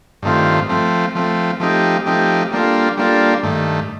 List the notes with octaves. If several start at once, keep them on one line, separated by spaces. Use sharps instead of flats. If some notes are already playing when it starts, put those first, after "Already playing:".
G2 D#3 A3 C4 F4
F3 A3 C4
F3 A3 C4
F3 A3 C4 D#4 G4
F3 A3 C4 D#4 G4
G3 A#3 D4 F4 A4
G3 A#3 D4 F4 A4
G2 D#3 A3